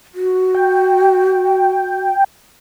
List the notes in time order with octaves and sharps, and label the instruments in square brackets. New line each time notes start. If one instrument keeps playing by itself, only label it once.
[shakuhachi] F#4
[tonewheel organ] G5